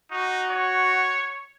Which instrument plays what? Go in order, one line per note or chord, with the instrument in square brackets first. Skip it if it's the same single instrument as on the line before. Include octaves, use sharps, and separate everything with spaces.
[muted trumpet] D#4 [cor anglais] F#4
[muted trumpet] C#5